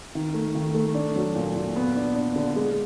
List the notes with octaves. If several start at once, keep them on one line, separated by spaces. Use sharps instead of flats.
D#3
A3
D#3
A3
D4
F#3
A#2
A#2
B3
D4
D4
D3
G#3